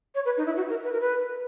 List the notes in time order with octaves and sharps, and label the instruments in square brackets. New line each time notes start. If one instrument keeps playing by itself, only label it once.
[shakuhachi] C#5
B4
D#4
E4
F#4
A#4
B4
A#4
B4